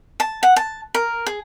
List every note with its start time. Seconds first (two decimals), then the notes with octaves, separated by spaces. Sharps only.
0.20 A5
0.43 F#5
0.56 A5
0.95 A#4
1.26 G#4